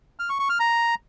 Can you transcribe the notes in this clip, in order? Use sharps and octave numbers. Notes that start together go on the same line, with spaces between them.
F6
C#6
C#6
F6
A#5